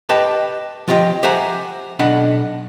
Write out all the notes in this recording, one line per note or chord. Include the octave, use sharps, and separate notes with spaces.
G4 B4 D#5 G5 A5
F3 F4 G4 D#5 G5
G4 C5 E5 F#5 G#5 A#5
B1 D4 D#5 F#5 B5